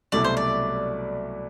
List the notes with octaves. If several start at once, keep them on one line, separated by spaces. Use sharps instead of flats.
C2 B2 F#3 A3 E4 D5
C5
D5